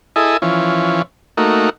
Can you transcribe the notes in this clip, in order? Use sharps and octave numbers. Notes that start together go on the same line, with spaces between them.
E4 G#4 A4 D#5
E3 F3 C#4
A3 A#3 D#4 F#4